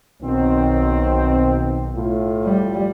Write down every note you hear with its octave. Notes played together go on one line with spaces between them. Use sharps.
B1 B2 D#3 C4
A2 F4
G3